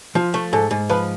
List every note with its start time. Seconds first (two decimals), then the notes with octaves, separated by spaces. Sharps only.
0.15 F3 F4
0.34 A3
0.52 G#2 A4
0.71 G#2
0.89 F3 B4